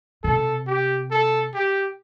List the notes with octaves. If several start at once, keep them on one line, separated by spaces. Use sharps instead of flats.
C3 A4
G4
A4
G4